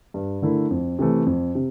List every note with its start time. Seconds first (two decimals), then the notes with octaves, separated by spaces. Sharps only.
0.14 G2
0.42 D3 A3 E4 A#4
0.71 F2
0.99 C3 E3 A3
1.26 F2
1.55 C3